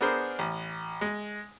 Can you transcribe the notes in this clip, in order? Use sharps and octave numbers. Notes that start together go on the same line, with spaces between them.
B3 D4 G#4 A#4 C5
A1
G#3